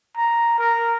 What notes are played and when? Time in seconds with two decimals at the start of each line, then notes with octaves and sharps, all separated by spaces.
0.17 A#5
0.59 A#4